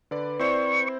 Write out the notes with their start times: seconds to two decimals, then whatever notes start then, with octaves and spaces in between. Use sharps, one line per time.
0.11 D3 B4 D5
0.39 C4 E4 C5 D5 C#6